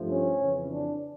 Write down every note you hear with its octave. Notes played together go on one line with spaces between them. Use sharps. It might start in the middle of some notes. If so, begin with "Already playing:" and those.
Already playing: G2 F3 A3
C#4
F2 C#3 E3
D4